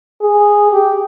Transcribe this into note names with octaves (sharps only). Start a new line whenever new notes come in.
G#4
G4